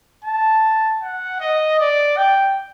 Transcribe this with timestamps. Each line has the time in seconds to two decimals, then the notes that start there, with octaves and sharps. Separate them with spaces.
0.24 A5
1.02 F#5
1.40 D#5
1.79 D5
2.17 G5